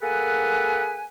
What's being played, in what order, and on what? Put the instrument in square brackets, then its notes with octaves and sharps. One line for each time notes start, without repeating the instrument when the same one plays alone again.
[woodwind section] A#3 G#4 A4 B4 F#5 G#5